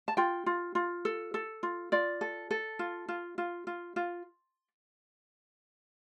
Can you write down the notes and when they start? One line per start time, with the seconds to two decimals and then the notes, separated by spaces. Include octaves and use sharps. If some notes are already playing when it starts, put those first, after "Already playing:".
0.08 A5
0.17 F4 G5
0.46 F4
0.75 F4
1.05 A4
1.34 A4
1.63 F4
1.92 F4 D5
2.21 A4
2.51 A4
2.79 F4
3.08 F4
3.38 F4
3.67 F4
3.96 F4